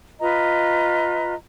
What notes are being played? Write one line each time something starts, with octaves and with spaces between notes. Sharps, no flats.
F4 B4 D#5 A#5